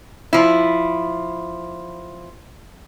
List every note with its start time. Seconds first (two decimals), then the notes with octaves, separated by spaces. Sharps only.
0.33 F3 E4